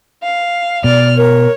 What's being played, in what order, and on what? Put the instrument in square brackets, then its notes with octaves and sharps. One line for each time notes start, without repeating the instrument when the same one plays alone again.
[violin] F5
[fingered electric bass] B2 [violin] D5 F6
[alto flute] A#4 [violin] C#5